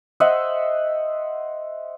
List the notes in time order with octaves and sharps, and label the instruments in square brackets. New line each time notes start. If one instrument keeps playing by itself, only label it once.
[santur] C5 D#5 E5 F#5